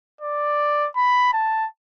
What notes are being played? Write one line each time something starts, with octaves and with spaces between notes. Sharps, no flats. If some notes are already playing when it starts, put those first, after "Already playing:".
D5
B5
A5